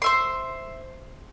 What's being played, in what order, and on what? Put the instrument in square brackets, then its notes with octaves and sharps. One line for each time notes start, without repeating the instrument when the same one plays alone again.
[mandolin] C5 E5 C6